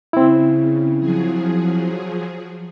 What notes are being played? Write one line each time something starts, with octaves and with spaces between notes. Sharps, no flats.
C#3 C4 E4
F3 F#3 G#4